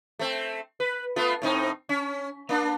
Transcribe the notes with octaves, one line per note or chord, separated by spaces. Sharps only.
A3 C4
B4
A3 B3 F4
A2 C4 D#4
C#4
A#3 D4